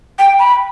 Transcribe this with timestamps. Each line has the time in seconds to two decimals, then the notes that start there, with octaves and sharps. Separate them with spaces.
0.19 G5
0.39 B5